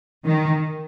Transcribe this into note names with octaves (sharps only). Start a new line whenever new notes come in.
D#3